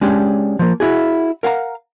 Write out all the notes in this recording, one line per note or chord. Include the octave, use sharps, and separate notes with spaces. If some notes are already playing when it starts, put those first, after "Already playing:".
G#3 C#4 D4 G4
F3 A#3
E4 F#4 G#4
A#4 F5 F#5 A#5